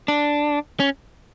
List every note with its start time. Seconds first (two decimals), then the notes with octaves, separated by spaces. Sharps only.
0.08 D4
0.80 C#4